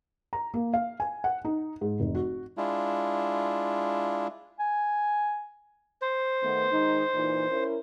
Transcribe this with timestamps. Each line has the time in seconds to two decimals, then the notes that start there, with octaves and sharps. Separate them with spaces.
0.33 A#5
0.54 A#3
0.74 F5
1.00 G#5
1.24 F#5
1.45 D#4
1.81 G#2
2.00 F1
2.15 F#4
2.57 G#3 D4 E4 F4
4.59 G#5
6.02 C5
6.42 D#3 A3 B3
6.72 D#3 G#3 D#4
7.13 A#2 E3 D#4
7.50 C#4 E4 A#4